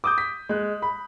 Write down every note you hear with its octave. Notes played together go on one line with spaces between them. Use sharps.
D6 D#6 G6
B6
G#3 F#6
B5